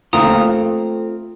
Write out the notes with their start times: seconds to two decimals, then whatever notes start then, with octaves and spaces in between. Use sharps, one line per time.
0.13 E2 D3 A3 A#3 C4 F4 A#5 D#6